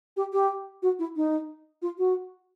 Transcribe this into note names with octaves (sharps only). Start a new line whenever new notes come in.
G4
G4
F#4
E4
D#4
F4
F#4